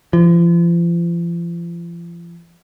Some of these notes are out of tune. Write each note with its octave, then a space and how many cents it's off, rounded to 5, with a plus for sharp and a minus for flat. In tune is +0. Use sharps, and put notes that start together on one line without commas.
F3 -40